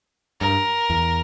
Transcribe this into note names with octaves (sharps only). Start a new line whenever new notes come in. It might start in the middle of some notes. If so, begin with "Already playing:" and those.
G2 A#4
E2